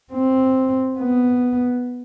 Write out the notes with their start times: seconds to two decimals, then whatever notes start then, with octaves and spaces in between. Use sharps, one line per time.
0.13 C4
0.99 B3